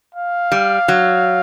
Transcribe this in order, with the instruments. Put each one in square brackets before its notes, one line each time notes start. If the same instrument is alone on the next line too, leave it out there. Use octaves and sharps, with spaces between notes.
[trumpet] F5
[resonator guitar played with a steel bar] G3
F#3